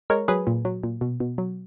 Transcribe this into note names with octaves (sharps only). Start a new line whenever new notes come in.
G#3 A#4 C#5
F#3 G#4 B4
A#2
F#3
A#2
B2
B2
F#3